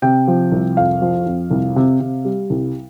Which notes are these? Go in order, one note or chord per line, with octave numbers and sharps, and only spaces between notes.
C3 G5
F3
C2
F2 F5
F3
F2
C2
C3
C3
G3
C2